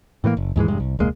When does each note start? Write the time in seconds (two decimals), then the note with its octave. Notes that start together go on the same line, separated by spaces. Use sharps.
0.24 A2 E3 A3 A#3
0.37 F#1
0.56 D#2 G#2 E3 G#3
0.68 E1 G2 G#3
0.80 C2
0.99 E1 C#2 G#3 A#3